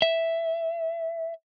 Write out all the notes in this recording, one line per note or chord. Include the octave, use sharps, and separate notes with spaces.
E5